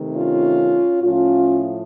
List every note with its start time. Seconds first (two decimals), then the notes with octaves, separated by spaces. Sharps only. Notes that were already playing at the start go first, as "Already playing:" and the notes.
Already playing: C3 D#3 A3
0.14 C#4 F4
1.03 A2 F3 A3 C#4 F4